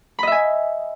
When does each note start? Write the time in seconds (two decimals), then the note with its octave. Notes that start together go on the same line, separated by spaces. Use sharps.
0.19 B5
0.23 D#5
0.27 E5
0.32 G#5